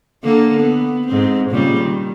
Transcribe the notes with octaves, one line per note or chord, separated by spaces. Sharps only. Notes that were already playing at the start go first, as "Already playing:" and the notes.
D3 A#3 A4
B3
G#2 C4
A#2 C#3 G3
D#3